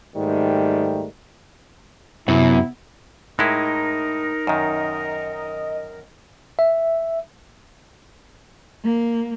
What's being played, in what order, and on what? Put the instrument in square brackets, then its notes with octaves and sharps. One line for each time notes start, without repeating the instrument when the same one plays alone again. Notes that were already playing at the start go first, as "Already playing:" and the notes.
[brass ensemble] G#2 D#3 G3 A3
[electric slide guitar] F#2 [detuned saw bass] C3 [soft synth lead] B3 [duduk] E4
[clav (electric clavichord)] A2 G#3 E4 [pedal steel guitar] D#4 [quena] A#4
[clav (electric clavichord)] F#2 D#3 [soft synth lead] D#5
[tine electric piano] E5
[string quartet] A#3